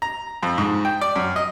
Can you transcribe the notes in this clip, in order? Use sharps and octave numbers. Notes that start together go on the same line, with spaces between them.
A#5
F2
G#2
G5
D5
F#2
D#5